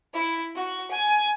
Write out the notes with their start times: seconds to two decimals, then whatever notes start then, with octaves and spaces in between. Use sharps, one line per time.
0.15 E4
0.55 F#4
0.90 G#5